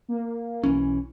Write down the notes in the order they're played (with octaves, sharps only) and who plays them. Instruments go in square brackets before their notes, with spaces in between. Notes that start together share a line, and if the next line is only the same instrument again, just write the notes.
[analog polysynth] A#3
[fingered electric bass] B1 E3 C#4